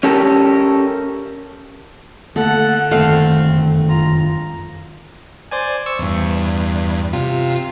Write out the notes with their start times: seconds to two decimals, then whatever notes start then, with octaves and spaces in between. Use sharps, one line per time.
0.03 C#4 G4 A4 A#4
2.36 D3 A3 A#3 A4 F#5
2.91 F1 F#2 D#3 A3 C4 F5
3.89 F4 A#5
5.51 C5 D5 G#5
5.86 C#6 E6
5.99 E2 G2
7.13 C3 F4